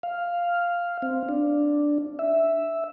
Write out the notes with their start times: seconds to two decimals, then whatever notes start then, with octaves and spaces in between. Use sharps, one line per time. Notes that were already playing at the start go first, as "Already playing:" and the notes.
0.03 F5
1.02 C4
1.29 D4
2.19 E5